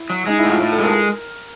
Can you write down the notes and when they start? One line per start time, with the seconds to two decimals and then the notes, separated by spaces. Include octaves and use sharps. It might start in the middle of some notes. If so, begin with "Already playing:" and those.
Already playing: E4
0.10 F#3
0.26 G#3 D#4
0.38 E4
0.44 A2
0.50 F4
0.61 A2
0.72 A4
0.78 G#3
0.84 A#4